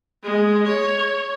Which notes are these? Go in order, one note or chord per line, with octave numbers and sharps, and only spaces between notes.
G#3
C#5